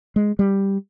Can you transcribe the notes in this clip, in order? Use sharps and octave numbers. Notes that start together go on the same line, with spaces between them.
G#3
G3